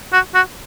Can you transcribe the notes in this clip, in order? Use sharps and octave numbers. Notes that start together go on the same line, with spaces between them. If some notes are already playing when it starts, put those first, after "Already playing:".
F#4
F#4